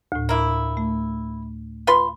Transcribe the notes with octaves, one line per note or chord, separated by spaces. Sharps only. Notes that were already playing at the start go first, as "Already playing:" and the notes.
D2 A2
A#3 E4
A3
F4 B4 C6